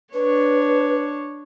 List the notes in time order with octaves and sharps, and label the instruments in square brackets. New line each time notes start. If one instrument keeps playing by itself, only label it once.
[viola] D4 C#5 [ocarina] B4